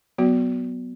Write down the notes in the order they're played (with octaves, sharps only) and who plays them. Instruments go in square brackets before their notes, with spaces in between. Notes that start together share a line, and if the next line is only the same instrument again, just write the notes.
[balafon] F#3 B3 F#4